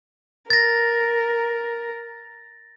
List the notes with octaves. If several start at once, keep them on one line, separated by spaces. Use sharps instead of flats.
A#4 A6 A#6